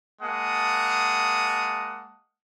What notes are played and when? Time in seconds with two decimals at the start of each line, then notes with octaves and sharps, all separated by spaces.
0.21 G#3 A#3 F#5 A5 D#6